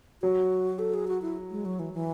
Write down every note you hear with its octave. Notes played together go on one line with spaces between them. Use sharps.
F#3 F#4
A4
G#4
F#4
E4
G#3
F#3
E3
E3